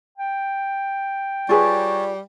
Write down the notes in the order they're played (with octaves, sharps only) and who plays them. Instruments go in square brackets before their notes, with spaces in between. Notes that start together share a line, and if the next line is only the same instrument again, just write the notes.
[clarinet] G5
[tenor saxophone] G3 [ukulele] F4 G#4 B4 [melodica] F#4 C#5 A5